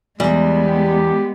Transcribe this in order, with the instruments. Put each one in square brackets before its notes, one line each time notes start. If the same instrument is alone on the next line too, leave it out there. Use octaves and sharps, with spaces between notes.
[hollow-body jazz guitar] E2 [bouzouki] G3 [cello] G#3 B3
[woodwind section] G4